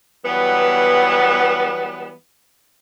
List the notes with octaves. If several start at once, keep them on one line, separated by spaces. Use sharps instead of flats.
E3 F#3 G3 B3